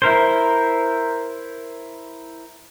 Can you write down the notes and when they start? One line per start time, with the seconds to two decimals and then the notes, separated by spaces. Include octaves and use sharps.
0.02 E4 A#4 C5